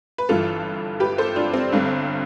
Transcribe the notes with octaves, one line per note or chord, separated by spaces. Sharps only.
B4
G1 G2 E3 F4 A4
G4 B4
A4 C5
D4 F4
C4
G1 G2 D3